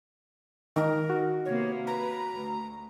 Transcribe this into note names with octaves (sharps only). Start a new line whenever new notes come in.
D#3 D#4 A#4
F#4
C3 A#3 B3 C#5
B4 A#5
D2